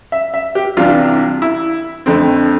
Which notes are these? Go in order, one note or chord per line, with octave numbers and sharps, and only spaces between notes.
E5
E5
G4
C2 C3 E3 G3 D4 F4
E4
F2 D3 A3 C4